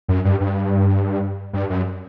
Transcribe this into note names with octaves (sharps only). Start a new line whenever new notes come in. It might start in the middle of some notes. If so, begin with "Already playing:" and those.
F#2
G2
G2
G2
F#2